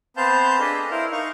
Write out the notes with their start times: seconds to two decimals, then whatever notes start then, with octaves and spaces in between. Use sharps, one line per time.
0.17 B3 C4 C5 F5 A5 G6
0.60 D4 G#4 A4 B4 D#5
0.77 D#5
0.91 E4 A#4 C5 F5
1.12 D#4 F5 C#6